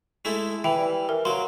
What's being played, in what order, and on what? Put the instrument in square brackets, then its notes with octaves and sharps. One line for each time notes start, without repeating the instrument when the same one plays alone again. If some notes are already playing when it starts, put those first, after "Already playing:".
[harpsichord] G#3 A3 E4
[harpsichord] E3 [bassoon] E4 [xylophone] G5
[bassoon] G3
[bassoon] E3 [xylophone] A#4
[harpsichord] F#3 D6 [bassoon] A#3 [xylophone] C6